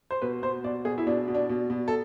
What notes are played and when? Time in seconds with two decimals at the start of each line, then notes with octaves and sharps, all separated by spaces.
0.11 C5
0.22 B2 B4
0.42 B2 C5
0.64 B2 D5
0.85 B2 G#4
0.98 E4
1.07 B2 D4
1.28 B2
1.35 D4
1.49 B2
1.70 B2
1.88 A4